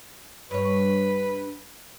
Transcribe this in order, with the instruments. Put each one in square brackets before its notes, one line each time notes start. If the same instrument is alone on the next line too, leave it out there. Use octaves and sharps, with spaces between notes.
[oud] G2 C#5 [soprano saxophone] B4